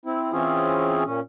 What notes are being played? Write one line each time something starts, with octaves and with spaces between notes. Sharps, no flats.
C4 E4
E3 C4 C#4 F4 G#4
A#2 C#4